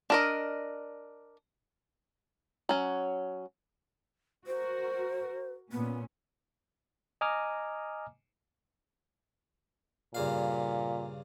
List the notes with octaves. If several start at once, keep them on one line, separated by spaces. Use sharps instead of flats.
D4 A#4 D#5
F#3 C#4
F#4 A#4 C5
A#2 B3 C#4
D#5 G#5 A#5 D6 D#6 F6
G2 A#2 C#3 F5